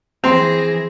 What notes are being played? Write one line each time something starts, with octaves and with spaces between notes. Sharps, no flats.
E3 C4 G#4 A#6